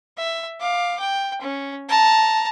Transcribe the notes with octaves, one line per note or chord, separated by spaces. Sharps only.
E5
F5 D6
G5
C#4
A5 A#5